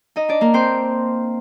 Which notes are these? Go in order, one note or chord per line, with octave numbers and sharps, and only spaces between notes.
D#4 D#5
D4 D5
A#3 A#4
C4 C5